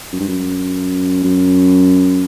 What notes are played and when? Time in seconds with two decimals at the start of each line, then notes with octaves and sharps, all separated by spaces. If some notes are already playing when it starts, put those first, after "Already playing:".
0.13 F#2
0.20 G2
0.28 F#2
1.24 F#2